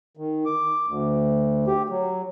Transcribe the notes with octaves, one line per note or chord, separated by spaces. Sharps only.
D#3
D6
D2
G4
F#3